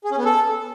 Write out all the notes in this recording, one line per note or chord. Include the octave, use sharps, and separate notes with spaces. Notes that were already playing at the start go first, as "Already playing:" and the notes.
G#4
C#4
B3
A4